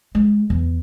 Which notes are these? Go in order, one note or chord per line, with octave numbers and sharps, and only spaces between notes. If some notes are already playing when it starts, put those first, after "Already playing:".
G#3
E2